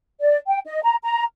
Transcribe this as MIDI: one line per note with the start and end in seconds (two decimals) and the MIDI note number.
0.21 0.37 74
0.47 0.59 79
0.66 0.80 75
0.83 0.96 82
1.03 1.23 82